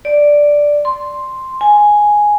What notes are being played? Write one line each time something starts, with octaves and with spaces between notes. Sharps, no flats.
D5
C6
G#5